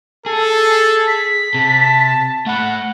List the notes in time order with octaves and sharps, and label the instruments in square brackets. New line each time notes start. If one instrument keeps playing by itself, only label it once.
[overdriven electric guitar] G#4 [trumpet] A4
[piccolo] B6
[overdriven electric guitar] C3 [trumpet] A5
[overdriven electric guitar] A3 B5 [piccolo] F#5